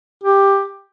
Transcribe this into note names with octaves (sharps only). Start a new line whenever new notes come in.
G4